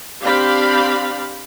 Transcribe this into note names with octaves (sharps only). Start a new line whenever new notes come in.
C4 D4 G4 F5 B5